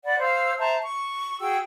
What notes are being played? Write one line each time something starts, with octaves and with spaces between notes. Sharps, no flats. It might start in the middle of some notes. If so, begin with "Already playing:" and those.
D5 F#5 B5
C5 F5 E6
C5 E5 A5 A#5
C#6
F#4 G#4 G5 E6